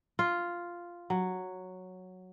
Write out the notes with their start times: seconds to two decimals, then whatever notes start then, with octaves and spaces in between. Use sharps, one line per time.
0.19 F4
1.10 F#3